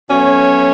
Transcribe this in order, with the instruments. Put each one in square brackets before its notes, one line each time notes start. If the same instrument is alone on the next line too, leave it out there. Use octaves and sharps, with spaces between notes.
[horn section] B2 F#3 A3 C#4 C#5